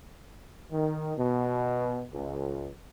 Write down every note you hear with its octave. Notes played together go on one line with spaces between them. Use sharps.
D#3
B2
C#2